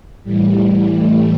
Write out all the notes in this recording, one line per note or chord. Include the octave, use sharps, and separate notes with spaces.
A2 E3 G3
A3